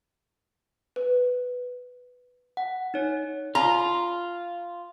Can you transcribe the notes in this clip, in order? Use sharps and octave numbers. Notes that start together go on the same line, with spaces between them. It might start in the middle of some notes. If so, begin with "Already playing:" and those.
B4
F#5
D#4 C#5
F4 A#5 C6